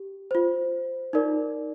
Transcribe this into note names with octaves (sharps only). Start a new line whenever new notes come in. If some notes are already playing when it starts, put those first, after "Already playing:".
Already playing: G4
F4 C5
D#4 A#4 D5